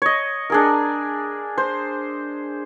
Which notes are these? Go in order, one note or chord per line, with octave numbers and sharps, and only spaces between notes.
C#5 D#5
D4 G#4 A#4
C5